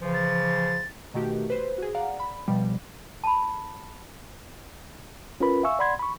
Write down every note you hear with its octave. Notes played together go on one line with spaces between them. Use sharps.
C#3 E3 F3
A6
B2 D#3 A3 F#4 G4
B4 C5
F#4 G#4
D5 F5 F#5 A#5
B5
B2 F3 G3
A5 B5
C#4 F4 A#4 B4 B5
E5 F5 G#5 C#6 E6
D5 F#5 B5 C6 G#6
B5 C#6